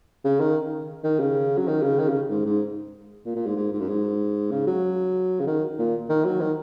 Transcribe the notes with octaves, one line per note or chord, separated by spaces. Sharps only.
C#3
D#3
D#3
C#3
F#3
D#3
C#3
D#3
C#3
G#2
G#2
A#2
A#2
G#2
G#2
G#2
F#2
G#2
C#3
F#3
C#3
D#3
A#2
D#3
F#3
D#3